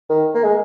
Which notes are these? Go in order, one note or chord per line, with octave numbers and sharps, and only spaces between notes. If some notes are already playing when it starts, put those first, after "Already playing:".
D#3
A#3
G#3